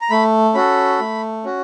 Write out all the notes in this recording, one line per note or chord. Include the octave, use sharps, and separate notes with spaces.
A#5
A3 B5
C#4 F#4 A4 B5
A3
C#4 F#4